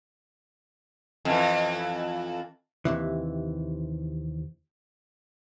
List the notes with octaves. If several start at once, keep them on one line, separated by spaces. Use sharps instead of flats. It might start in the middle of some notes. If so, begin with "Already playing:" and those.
F2 E3
D#2 C3 E3